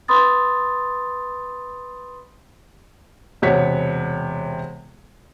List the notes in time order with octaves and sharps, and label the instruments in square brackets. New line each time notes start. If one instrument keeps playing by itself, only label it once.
[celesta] B4 B5 C6 D#6 A6
[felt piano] E1 C3 C#5 F#5 B6